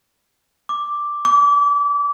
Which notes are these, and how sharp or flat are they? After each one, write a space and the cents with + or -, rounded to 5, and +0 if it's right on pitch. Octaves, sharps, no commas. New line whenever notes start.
D6 +0
D6 -30